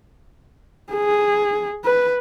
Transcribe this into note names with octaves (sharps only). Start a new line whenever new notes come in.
G#4
B4